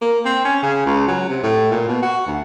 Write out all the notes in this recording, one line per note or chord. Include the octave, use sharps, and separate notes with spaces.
A#3
C4
C#4
C#3
C#2
F#3
C3
A2
A#2
B2
F#4
D2